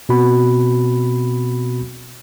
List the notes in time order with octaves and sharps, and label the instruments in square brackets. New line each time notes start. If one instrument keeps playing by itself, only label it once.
[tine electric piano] B2 C4 F#4 B5